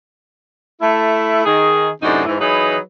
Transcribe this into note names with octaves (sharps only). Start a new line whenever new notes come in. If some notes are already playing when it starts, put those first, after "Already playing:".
A3 E4
D#3 G#4
F#2 A2 C3 D4 D#4
G#2 E3
E3 F#3 D#4 G#4 B4